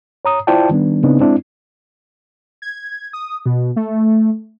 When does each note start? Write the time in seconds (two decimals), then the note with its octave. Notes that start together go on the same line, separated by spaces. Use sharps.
0.25 C#5 A#5 D#6
0.47 E4 F4 C5 D5 G5 A5
0.69 D#3 G3 B3 D4
1.03 C#3 B3 C4 D4 D#4
1.19 G#3 C4 D4 E4
2.62 G#6
3.13 D#6
3.46 B2
3.76 A3